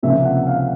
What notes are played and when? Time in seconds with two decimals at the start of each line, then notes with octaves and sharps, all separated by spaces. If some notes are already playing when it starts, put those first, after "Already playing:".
0.03 C#2 C3 F3 A#3 C#4 E5
0.25 F#5
0.47 F5